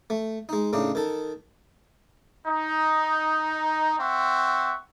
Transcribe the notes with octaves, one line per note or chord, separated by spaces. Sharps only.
A3
G#3 D#4
A2 C#3 D4 D#4
D#3 A4
D#4
C4 E5 F#5 C#6